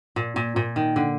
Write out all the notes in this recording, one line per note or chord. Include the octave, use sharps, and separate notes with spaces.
A#2
A#2
A#2
D#3
D3